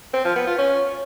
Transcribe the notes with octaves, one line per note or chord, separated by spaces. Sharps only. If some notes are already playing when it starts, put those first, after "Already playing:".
C4
F3
B3
F4
C#4